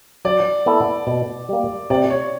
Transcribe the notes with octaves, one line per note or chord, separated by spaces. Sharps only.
F#3 D5
B3 E4 A4
B2
G3 A#3
C3 D5
C#5